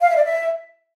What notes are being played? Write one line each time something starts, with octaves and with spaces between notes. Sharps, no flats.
F5
E5
D5
E5